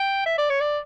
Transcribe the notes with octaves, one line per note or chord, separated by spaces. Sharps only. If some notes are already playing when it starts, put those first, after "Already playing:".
Already playing: G5
E5
D5
C#5
D5